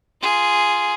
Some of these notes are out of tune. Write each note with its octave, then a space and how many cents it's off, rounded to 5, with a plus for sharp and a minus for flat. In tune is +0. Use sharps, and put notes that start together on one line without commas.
F4 -5 G#4 +0